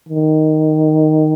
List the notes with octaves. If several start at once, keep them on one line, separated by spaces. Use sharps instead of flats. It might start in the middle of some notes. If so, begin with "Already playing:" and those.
D#3